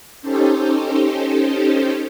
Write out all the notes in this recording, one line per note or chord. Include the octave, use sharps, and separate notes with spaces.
C#4 D#4 G4 A4 C5